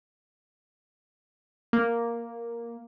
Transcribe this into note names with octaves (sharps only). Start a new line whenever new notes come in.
A#3